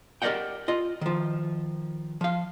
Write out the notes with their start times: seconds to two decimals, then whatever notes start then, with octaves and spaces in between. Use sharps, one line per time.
0.22 G4 A#4 D5 D#5 F#5 G5
0.68 F4 D#5
1.01 D#3 F3
2.21 F3 F5